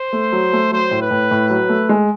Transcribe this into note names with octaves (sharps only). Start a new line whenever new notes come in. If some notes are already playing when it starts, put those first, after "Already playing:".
Already playing: C5
A3
F#3
A3
F#3 C5
A2
B4
A2
A2
F#3
A3
G#3